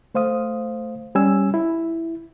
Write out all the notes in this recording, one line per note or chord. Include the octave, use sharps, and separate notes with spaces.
A3 C5 F5 D#6
G3 C#4 G#5 E6
E4